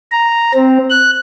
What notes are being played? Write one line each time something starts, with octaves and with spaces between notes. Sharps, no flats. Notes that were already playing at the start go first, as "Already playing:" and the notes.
A#5
C4
F#6